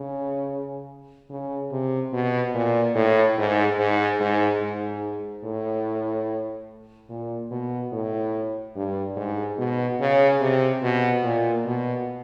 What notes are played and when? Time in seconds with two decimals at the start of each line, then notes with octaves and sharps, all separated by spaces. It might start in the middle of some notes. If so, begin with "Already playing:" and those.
Already playing: C#3
1.30 C#3
1.71 C3
2.13 B2
2.55 A#2
2.95 A2
3.38 G#2
3.79 G#2
4.20 G#2
4.61 G#2
5.44 A2
7.10 A#2
7.51 B2
7.93 A2
8.76 G2
9.17 G#2
9.58 B2
10.00 C#3
10.41 C3
10.82 B2
11.24 A#2
11.66 B2